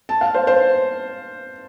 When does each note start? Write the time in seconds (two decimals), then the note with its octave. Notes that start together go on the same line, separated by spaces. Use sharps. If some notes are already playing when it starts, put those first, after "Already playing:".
0.09 A5
0.21 F5
0.34 C5
0.47 C5